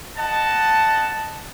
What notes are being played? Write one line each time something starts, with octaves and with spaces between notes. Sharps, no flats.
D#5 F#5 A5